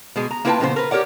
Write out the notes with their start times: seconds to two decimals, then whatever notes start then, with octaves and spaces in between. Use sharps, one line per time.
0.16 B2 G#3 G#4
0.31 A#5
0.45 A#3 E4 F4 B4 G5 A5
0.60 A#2 C#3 F3 B3 E4 C5
0.76 A#4 B4
0.91 G4 A#4 C#5 D5 F#5